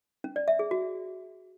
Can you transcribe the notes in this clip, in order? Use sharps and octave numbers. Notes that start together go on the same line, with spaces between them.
C#4
D5
E5
G#4
F#4